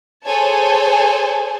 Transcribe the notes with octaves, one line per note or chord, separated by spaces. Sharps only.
G#4 A4 C5 C#5 G#5 A5